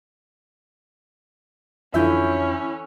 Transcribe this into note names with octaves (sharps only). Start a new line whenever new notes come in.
F2 D3 E3 C#4 E4 F4 E5 G6